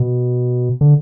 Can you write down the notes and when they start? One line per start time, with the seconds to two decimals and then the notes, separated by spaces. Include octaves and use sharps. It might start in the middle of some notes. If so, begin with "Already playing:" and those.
Already playing: B2
0.81 D3